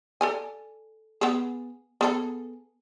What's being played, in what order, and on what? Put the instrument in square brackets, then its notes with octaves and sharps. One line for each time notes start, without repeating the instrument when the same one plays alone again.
[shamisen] A4 D5 G#5
B3 G#4
B3 G#4 A4